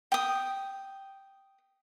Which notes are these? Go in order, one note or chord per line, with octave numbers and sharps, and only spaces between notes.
G5 D#6